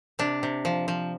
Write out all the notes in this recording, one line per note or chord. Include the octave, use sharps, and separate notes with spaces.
C3 D4
C3
F3
F3